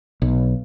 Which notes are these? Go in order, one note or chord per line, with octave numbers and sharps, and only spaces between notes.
B1